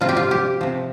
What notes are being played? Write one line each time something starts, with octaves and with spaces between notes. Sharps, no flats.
C3 F3 F4
G4
F4
G4
C3 F3